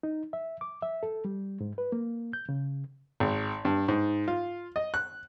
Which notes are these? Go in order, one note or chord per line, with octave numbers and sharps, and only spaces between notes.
D#4
E5
D6
E5
A4
G3
G#2
B4
A#3
G6
C#3
G#1
G2
G#2
F4
D#5
F#6